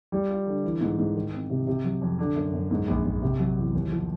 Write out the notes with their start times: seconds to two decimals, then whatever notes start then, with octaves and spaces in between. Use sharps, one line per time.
0.12 G3
0.30 F4
0.47 D3
0.64 E3
0.81 G#2
0.98 G#2
1.15 D#3
1.33 C4
1.50 C3
1.67 C3
1.84 F#3
2.01 F2
2.19 D3
2.36 F#2
2.53 F#2
2.71 G#2
2.88 A#1
3.05 A#1
3.22 C3
3.39 F#3
3.56 E2
3.74 D#2
3.91 F3